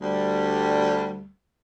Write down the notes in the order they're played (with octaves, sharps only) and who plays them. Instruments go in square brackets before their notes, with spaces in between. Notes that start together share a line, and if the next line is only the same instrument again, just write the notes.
[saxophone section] D2 G3